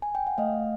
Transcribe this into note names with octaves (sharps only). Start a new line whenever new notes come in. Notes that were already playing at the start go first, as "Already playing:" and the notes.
G#5
G5
F#5
A3 D#5 F5